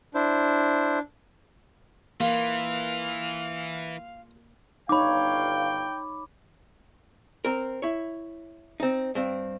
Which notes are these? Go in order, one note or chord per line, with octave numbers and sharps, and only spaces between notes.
D4 E4 C5
E3 A#3 F4 F5
G1 D#4 C#5 F5 G5 B5 D6
C4 A#4
E4 C#5
C4 D#4
G2 C4